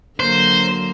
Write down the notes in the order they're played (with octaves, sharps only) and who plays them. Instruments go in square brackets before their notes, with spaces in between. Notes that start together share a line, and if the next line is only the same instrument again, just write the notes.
[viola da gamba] D3 F#3 A#3 [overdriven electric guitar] C5